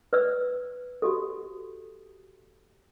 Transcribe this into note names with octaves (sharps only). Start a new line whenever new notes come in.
B4 D5 E6
F#4 G4 A4